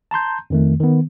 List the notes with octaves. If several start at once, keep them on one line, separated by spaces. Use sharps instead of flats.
A5 A#5 C6 G6
F2 D#3 A3
D#3 B3